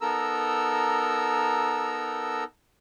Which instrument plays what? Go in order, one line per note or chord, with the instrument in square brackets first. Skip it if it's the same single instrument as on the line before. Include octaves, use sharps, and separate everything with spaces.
[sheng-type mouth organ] B3 D#4 A4 A#4 A#5 E6